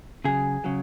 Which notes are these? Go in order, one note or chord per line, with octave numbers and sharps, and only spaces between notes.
C#3 F#3 G#4
C#3 F#3